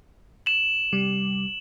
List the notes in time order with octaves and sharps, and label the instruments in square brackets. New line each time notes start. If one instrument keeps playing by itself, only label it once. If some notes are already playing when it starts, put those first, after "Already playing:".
[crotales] E7 F#7
[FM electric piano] C3 G3